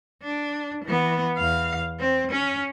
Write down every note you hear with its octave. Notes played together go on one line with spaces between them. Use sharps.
D4
E3 B3
E2 F5
C4
C#4